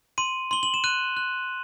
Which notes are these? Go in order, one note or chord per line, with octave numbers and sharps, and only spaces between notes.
C6 D#7
C6 G7
F#7
E7
F#6 D#7
F#6